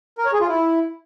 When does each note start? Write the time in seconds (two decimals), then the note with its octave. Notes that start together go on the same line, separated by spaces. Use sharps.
0.18 A#4
0.26 C#5
0.33 G#4
0.41 F4
0.48 E4